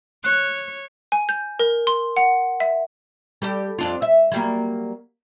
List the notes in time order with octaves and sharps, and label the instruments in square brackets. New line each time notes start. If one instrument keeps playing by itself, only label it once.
[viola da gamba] C#5 [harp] F#6
[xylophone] G#5
G6
A#4
C6
F#5
E5
[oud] G3 G4 A4
F2 D4 F4
E5
F#3 G3 A#3